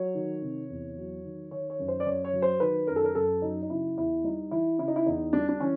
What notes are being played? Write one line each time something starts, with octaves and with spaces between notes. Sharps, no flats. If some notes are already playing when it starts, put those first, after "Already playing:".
Already playing: F#3 C#5
D#3
C3
E2
F#3
D#3
D#3 C#5
C#5
F#2
C5
D5
F#2 C#5
C#5
F#3
C5
D#3 B4
F#2 A#4
A4
A#4
F#2 A4
F#3 D#4
D#4
C#3 E4
E2 E4
G3 D#4
E3 E4
C#3 E4
D#4
E4
E2 D#4
G3 D4
D4
E3 C#4